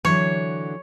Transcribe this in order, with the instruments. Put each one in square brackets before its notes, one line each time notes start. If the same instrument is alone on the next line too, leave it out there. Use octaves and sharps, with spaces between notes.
[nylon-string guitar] D3 E3 F#3 [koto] C#5